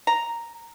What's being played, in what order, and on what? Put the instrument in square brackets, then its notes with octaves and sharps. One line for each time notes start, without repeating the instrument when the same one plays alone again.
[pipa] A#5